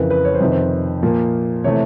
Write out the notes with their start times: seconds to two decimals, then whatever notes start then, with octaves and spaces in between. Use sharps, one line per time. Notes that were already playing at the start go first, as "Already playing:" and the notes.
Already playing: F2 C#3 E3 A#4 B4
0.10 B4
0.25 C#5
0.34 C5
0.40 F2 C3 D#3 B4
0.52 C5
1.03 A#2 F3 A#3
1.64 C3 E3 A3 C#5